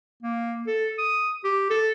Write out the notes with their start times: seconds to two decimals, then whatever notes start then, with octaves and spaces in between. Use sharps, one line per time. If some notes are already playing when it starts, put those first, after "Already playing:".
0.23 A#3
0.67 A4
0.98 D#6
1.44 G4
1.70 A4